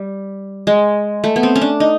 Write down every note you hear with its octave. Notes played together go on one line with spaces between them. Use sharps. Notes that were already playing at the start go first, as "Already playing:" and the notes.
Already playing: G3
G#3
A3
B3
C4
C#4
D4
D#4